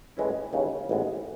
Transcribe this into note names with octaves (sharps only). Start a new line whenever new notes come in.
A2 E3 G#3 C#4 E4
D#2 C#3 E3
A1 G#2 E3 G#3 B3